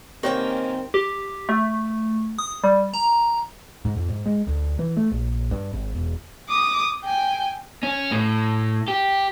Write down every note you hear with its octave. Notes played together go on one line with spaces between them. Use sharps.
D#3 A#3 C4 C#4 G4 C#5 G5
G4
A3
D#6
G3
A#5
G#2
F2
G#2
G#3
D2
E3
A3
A#1
G2
G#1
E1
D6 D#6
G5 G#5
C#4
A2
G4